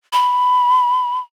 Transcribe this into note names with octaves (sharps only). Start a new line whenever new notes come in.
B5